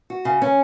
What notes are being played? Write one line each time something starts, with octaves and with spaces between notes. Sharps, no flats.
F#4
C#3
C#4